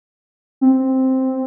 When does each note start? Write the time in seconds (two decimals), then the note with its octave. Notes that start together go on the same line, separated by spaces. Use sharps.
0.61 C4